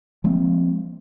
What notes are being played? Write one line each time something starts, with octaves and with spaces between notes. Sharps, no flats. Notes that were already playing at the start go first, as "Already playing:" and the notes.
F3 G#3 A#3 C4